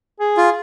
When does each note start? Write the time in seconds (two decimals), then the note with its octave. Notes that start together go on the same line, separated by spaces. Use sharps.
0.20 G#4
0.37 F4